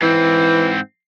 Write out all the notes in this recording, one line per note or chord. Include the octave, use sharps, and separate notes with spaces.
G#2 E3 C4